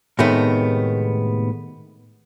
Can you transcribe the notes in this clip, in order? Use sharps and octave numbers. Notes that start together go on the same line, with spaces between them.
A2 C3 D#3 G#3 A3 B3